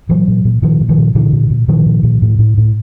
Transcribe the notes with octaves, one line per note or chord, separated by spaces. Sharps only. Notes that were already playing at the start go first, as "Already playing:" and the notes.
A#2 E3 F#3
A#2
A#2
A#2 D#3 F3
A#2
D#3 F3
A#2
A#2 D3 E3
A#2
A#2
A#2 D#3 F3
A#2
A#2
A2
A2
A2